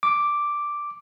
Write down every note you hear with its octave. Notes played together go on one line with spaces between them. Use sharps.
D6